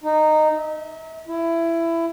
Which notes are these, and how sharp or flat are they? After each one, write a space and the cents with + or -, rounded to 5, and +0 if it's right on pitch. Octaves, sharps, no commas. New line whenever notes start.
D#4 -15
E5 -40
E4 +15